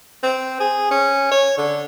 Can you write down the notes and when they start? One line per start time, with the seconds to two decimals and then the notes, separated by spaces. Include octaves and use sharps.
0.23 C4
0.60 G#4
0.91 C#4
1.31 C#5
1.58 D3